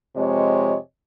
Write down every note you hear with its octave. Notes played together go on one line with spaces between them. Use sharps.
F2 C3 G#3 C#5 D#5